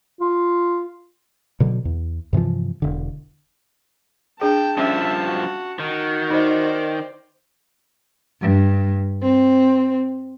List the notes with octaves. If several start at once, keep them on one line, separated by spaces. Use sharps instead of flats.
F4
B2 D3 F#3
E2
G2 C3 E3 F3
E1 D3
D4 G#4 G5 A5
G2 F3 C#4 E5
F#4
D#3 F#4
D#4 C5 D5 D#5
G2
C4